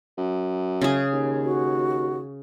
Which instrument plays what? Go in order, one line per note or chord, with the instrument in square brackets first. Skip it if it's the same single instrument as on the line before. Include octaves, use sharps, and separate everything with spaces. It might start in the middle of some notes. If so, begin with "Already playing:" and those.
[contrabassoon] F#2
[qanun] C#3 G#4
[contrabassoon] D#2
[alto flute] F#4